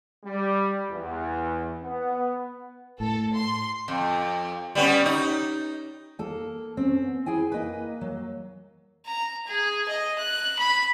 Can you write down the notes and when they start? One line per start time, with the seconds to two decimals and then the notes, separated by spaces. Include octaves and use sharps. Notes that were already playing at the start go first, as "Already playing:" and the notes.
0.24 G3
0.90 E2
1.82 B3
3.00 A2 A4
3.36 C6
3.88 F2
4.75 G3 B3 C#4
5.06 D#4
6.19 A#3 A4
6.77 C4 C#4
7.02 B3
7.26 E4 G#4 G5 G#5
7.52 A#3 B4 D#5
8.01 F#3
9.06 A#5
9.47 G#4
9.88 D#5
10.18 F#6
10.59 B5